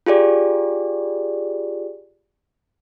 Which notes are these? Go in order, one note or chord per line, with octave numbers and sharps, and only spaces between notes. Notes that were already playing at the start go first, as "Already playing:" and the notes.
F4 G4 G#4 D5